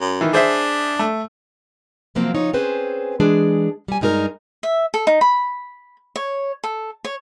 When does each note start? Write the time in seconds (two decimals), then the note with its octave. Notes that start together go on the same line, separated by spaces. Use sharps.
0.01 F#2
0.21 D#3 E3
0.33 D4 G#4 C5 E5
0.99 A3
2.15 C3 F3 F#3 A#3 C4
2.34 C#3 F3 D#4 C#5
2.53 C4 C#4 G#4 B4 C5
3.20 E3 G#3 D4 G#4
3.88 G3 G#5
4.01 G2 G#3 D#4 G4 A#4
4.63 E5
4.94 A4
5.07 D#4
5.21 B5
6.16 C#5
6.64 A4
7.04 C#5